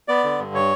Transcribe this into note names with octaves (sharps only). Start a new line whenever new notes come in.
B3 D5
D3
G2
C#5